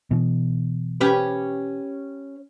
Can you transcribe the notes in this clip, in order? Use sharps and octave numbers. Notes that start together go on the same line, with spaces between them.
B2 E3
C#4 G4 B4